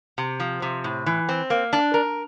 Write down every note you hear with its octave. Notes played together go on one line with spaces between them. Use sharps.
C3
F3
C3
A2
E3
C4
A#3
D4
A#4